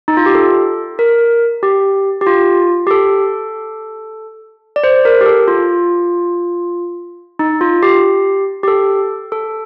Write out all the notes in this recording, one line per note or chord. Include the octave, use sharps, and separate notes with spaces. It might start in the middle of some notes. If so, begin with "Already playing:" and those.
D#4
F4
G4
A4
A#4
G4
G4
F4
G4
A4
D5
C5
A#4
G4
A4
F4
D#4
F4
G4
G4
A4
A4